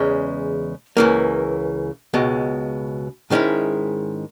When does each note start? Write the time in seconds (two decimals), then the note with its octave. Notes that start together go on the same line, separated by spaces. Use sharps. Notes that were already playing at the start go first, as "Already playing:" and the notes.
Already playing: E2 C#3 G#3 C#4
0.97 C#2 C#3 E3 A#3
2.14 C#2 B2 G#3
3.30 G#2 D#3 G#3 C#4 E4